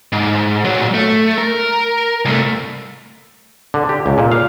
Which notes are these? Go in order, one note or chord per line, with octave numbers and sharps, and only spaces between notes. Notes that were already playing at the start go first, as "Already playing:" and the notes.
G#2
A#2 F#3
A3
A#4
C2 A3
D3
G4
C#2
A#2
F5